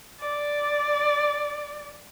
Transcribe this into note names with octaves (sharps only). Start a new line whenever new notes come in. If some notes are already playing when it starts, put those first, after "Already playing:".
D5